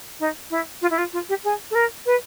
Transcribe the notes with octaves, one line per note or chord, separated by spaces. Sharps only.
D#4
E4
F4
E4
F4
F4
G4
G#4
A4
A#4
B4